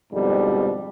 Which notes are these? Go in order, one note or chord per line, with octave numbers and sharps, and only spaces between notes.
F2 G#2 B2 D3 G3